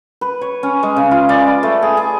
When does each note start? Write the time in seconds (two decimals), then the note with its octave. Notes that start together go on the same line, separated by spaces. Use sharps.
0.21 B4
0.41 C#5
0.63 C#4
0.83 G#3
0.96 C#3
1.11 F4
1.29 D5
1.48 B5
1.63 A3
1.82 G#4
1.97 G#4